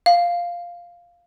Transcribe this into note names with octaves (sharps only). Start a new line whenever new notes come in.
F5